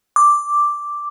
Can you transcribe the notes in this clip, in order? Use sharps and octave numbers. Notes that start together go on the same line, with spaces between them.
D6